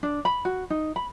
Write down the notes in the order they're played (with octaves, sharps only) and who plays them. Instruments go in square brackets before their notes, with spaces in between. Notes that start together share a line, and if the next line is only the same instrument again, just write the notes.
[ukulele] D4
B5
F#4
D#4
B5